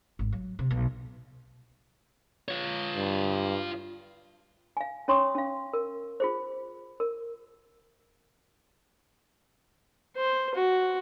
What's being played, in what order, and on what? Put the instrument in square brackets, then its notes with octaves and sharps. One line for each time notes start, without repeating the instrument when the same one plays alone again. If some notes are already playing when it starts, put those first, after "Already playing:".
[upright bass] G#1
F#3
C3
B1
[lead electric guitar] F4 C#5
[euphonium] G2
[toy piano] F5 G#5
C#4 C#5 C6 C#6 D#6
C#4 F5
A#4
F4 G#4 C5
A#4
[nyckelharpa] C5
F#4